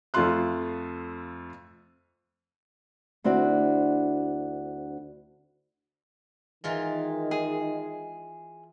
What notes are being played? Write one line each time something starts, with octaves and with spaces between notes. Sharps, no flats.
F2 A3 F4 F5 C6 F#6
D2 C4 D4 E4 F#4
D#3 E3 G#3 F4 A#4
G#4